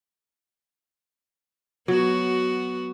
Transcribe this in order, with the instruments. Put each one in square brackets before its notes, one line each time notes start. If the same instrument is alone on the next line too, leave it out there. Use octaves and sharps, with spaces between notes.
[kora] F#3 [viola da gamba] B3 F#4